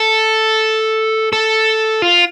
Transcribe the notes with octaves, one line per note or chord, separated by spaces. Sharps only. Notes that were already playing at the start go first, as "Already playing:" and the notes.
Already playing: A4
A4
F4